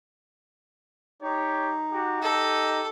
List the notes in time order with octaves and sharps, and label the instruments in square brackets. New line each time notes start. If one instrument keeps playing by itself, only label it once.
[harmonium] D#4 [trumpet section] G4 C#5
[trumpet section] F#4 G4
[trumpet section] G4 D#5 [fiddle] A4